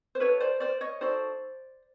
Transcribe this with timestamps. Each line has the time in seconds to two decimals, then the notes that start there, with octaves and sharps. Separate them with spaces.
0.15 C5
0.20 D#4 F#4 A4 B4 C#5
0.40 C5 D5
0.60 C5 D5
0.81 C#5 D#5
1.01 D#4 F#4 A4 C5 D5